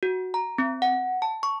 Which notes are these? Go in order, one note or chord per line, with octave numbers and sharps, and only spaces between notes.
F#4
A#5
C4
F#5
A5
C#6